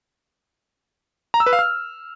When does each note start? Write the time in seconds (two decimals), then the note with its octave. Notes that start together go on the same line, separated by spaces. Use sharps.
1.34 A#5
1.40 E6
1.46 B4
1.53 F5
1.59 F6